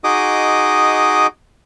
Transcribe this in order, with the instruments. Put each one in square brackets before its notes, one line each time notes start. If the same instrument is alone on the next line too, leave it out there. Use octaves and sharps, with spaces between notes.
[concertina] D#4 F#4 G#4 D#5 D6 D#6